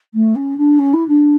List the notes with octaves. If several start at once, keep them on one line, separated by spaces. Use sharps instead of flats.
A3
C#4
D4
C#4
E4
D4